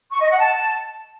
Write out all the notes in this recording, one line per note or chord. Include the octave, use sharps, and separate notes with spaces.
C#6
D#5
F#5
A5